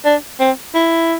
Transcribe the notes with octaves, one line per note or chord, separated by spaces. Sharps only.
D4
C4
E4